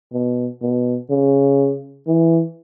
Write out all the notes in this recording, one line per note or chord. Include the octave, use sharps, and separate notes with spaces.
B2
B2
C#3
E3